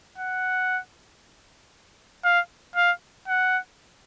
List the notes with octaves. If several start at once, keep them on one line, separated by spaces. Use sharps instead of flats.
F#5
F5
F5
F#5